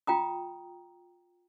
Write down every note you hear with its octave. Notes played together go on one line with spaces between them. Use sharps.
F4 G5 A#5 D#6